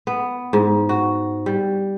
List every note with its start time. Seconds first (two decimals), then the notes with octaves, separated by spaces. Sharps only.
0.07 B3
0.53 G#2
0.89 F#4
1.46 G3